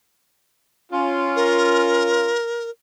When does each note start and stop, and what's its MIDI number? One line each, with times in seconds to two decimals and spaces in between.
0.92 2.40 61
0.92 2.40 65
1.36 2.70 70